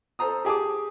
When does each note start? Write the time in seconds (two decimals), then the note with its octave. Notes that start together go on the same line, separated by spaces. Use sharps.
0.19 A4 C5 A#5 D#6
0.45 G4 G#4 A5 D6